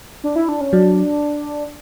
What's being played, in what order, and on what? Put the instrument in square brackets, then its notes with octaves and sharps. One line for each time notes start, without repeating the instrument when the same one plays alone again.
[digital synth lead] D4
E4
D4
C#4
[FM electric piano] F#3 [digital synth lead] D4